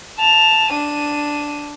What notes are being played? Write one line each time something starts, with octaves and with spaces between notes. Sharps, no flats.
A5 F7
D4 D#7